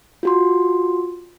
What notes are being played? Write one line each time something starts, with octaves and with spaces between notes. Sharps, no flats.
F4 F#4 C6